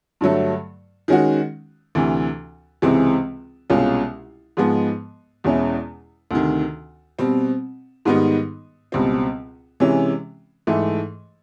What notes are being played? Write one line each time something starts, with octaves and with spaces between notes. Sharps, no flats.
G2 D3 F#3 A3
D#3 G#3 C#4 F#4
D2 C3 E3
C#2 C3 E3 G#3 C4
C2 B2 G#3 C#4 F4
G#2 F3 G#3 B3
E2 B2 G#3 C#4 E4
D2 C3 D#3
B2 G3 C4
G#2 D#3 G3 B3 D#4
C#2 B2 G3 C4
C3 E3 G#3 C#4
G#2 E3 A3